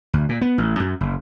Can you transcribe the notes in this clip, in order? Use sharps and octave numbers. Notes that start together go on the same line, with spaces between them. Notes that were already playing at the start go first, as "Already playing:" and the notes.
D2
A#2
B3
A1
F#2
F#1